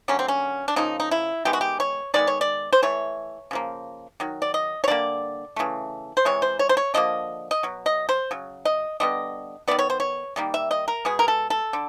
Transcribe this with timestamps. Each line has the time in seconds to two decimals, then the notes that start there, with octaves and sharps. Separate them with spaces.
0.08 D3 F#3 A#3 C#4
0.19 C4
0.28 C#4
0.68 D4
0.76 C#3 F3 A#3 D#4
1.00 D#4
1.11 E4
1.45 D#3 G#3 B3 G4
1.53 F#4
1.61 G4
1.80 C#5
2.14 D#3 G#3 B3 D5
2.27 C#5
2.41 D5
2.73 C5
2.82 E3 A3 C#5
3.51 C#3 F3 A#3
4.20 D#3 F#3
4.42 D5
4.54 D#5
4.84 C#5
4.88 D3 G3 A#3 D5
5.56 C#3 E3 A3
6.17 C5
6.25 C3 E3 G#3 C#5
6.42 C5
6.59 C#5
6.69 C5
6.77 C#5
6.94 D3 F3 A#3 D#5
7.51 D#5
7.63 B2 F#3
7.86 D#5
8.09 C5
8.31 C#3 F#3
8.65 D#5
9.00 D3 G3 B3 D#5
9.68 D#3 G#3 B3 D5
9.79 C#5
9.90 C5
10.00 C#5
10.36 D#3 G3 A#3
10.54 E5
10.71 D#5
10.88 A#4
11.05 B2 G#3 B3 G#4
11.19 A#4
11.28 A4
11.50 A4
11.73 D3